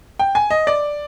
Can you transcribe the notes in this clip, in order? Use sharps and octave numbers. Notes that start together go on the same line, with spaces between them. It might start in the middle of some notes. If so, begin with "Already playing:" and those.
G5
G#5
D#5
D5